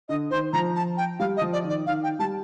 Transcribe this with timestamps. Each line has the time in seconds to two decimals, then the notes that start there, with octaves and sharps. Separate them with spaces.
0.09 D3 D#5
0.31 D#3 C5
0.53 F3 A#5
0.75 A5
0.97 G5
1.19 G3 F5
1.37 D#5
1.41 F3
1.53 D5
1.64 D#3
1.69 D5
1.86 D#3 F5
2.03 G5
2.19 G3 A5